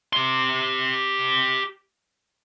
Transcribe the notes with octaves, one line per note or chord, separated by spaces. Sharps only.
G4 C6